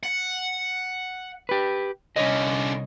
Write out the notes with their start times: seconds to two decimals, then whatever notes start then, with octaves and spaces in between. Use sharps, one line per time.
0.03 F#5
1.49 G4 B4
2.16 C2 D3 C#4 C#5 D#5